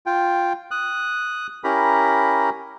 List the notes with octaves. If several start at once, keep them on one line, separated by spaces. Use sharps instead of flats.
F4 G5
D#6 F#6
C#4 E4 G4 A#4 A#5 B5